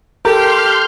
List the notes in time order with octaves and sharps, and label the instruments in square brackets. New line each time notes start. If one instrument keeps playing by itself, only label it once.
[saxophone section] G4 [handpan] A4 [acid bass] A#4 [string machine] C6 F6 G6